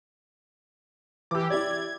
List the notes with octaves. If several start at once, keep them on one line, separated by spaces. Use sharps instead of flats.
E3 G4 D6 E6
E4 G4 D5 G#6